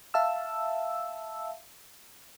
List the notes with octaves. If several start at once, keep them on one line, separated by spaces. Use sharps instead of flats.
E5 F5 A5 E6